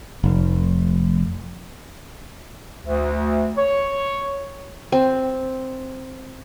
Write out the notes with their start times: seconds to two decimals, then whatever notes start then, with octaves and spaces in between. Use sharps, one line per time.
0.24 F1
2.82 D2
3.57 C#5
4.92 C4